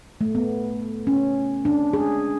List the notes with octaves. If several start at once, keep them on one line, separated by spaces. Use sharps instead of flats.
A3
B3
C#4
D4
G#4